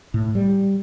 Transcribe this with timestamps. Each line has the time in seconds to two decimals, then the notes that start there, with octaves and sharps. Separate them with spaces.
0.14 A2
0.35 G3